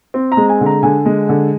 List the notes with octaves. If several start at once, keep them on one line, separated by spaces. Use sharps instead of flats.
C4
A#5
G#3
G#5
D3
A#5
D3 G#5
G#3
D3